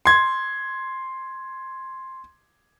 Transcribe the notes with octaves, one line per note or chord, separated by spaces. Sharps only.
C6 G#6